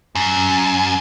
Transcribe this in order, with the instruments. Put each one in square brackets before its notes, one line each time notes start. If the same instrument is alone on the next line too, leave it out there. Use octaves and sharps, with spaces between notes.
[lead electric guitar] F#2